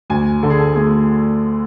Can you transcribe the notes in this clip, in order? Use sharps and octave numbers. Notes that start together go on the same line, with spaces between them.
D2 G#5
D3 A4
G#4
A4
A3 G#4